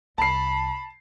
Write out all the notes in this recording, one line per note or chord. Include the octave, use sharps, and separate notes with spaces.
C2 A5 B5 C7